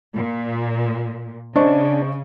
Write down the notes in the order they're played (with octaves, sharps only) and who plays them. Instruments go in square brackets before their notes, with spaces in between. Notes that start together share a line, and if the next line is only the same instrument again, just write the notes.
[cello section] A#2
[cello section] C#3 [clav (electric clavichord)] D4 [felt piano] C5 D#5 C#6